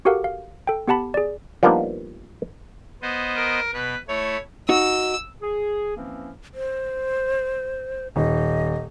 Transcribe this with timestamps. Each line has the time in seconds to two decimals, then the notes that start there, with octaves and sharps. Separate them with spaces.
0.05 F#4 G4 A4 A#4 F5 F#5
0.24 F5
0.67 A4 G5
0.88 B3 G4 F#5 A5 B5
1.14 G#4 D5
1.63 F3 G3 A#3 B3 D4 D#4
3.02 B3 C5 D#5
3.36 A#4
3.73 B2 B4
4.08 A3 E4 C#5
4.69 D#4 F#4 E6
5.42 G#4
5.97 E3 F3 A#3 C4 C#4
6.54 C5
8.16 D#1 D#5